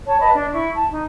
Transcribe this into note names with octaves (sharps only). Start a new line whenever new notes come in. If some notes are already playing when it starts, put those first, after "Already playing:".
C#5 A5
B4 D#5 A5 B5
D4
E4 C#6
A5
D#4